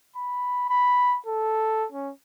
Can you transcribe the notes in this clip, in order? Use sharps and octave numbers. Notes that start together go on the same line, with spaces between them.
B5
B5
A4
C#4